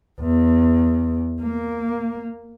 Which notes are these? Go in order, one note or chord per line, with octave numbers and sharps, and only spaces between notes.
E2
A#3